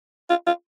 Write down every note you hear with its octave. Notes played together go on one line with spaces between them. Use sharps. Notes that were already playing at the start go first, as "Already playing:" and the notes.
F4
F4